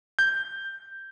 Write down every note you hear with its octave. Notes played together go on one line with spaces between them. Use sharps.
G6